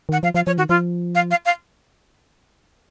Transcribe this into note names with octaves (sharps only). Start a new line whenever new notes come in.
D#3 F#5
F3 F5
F3 F5
F3 C#5
D#3 F#4
F3 F4
F5
F5
F5